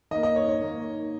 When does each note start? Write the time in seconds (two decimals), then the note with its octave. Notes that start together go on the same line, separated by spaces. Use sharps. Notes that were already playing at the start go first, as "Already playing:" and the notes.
0.11 D#3 D#5
0.15 A#3
0.23 D#5
0.36 C#5
0.48 C#5
0.61 D#3 A#3